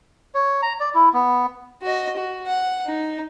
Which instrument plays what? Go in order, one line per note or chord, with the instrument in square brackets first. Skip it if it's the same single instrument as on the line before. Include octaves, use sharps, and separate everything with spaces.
[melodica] C#5
A#5
D5
E4
B3
[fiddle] F#4 D#5
F#4
F#5
D#4